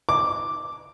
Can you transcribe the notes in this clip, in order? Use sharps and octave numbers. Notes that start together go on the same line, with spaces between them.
D6